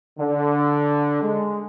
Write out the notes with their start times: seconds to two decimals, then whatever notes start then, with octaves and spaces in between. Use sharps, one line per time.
0.18 D3
1.21 G#3